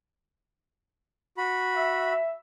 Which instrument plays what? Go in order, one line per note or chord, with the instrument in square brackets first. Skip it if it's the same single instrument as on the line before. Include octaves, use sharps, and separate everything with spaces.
[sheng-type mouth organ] F#4 B5
[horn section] E5